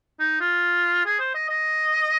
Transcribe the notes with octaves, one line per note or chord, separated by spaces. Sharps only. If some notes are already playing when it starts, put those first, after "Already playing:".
D#4
F4
G#4
C5
D#5
D#5